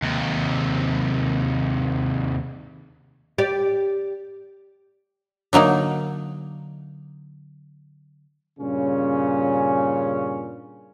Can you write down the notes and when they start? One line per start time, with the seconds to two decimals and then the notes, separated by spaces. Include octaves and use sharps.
0.02 D#2 C3
3.38 G4 D5
5.53 D3 F#3 A#3 D#4
8.59 G2 A#2 C#3 C#4